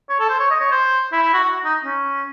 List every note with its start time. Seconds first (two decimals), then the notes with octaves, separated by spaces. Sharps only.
0.09 C#5
0.20 A4
0.29 C5
0.39 C#5
0.50 D#5
0.60 C#5
0.71 C5
1.12 E4
1.22 E4
1.33 F#4
1.44 F#4
1.65 D#4
1.84 C#4